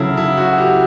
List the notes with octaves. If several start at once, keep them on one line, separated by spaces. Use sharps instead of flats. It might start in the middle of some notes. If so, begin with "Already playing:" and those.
Already playing: C#3 F#3 E4 A4
E4
F#4
G4